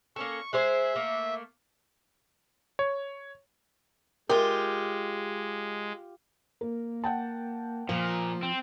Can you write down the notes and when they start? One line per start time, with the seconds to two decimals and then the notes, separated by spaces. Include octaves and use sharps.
0.16 A#3 C#4 A4 C#6
0.53 G#3 G#4 C5 E5
0.96 A3 A#3
2.79 C#5
4.29 G#3 F4 G4 A#4
6.61 A#3 A#4
7.04 F#5 G5 A5
7.89 A#2 F3
8.43 C4